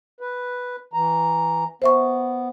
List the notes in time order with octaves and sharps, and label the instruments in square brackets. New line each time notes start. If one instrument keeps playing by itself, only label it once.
[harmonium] B4
E3 A#5
[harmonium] B3 [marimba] C5 E5 C#6